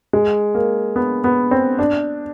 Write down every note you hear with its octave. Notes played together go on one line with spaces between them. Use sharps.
G#3
A#3
B3
B3
C4
D4